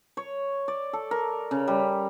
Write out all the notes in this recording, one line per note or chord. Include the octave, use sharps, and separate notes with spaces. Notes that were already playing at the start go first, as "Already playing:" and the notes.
C#5
D5
A4
A#4
C#3
G3